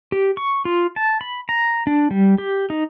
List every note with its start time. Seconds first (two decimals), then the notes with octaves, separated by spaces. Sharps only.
0.12 G4
0.37 C#6
0.65 F4
0.96 A5
1.21 B5
1.49 A#5
1.87 D4
2.11 G3
2.38 G4
2.70 D#4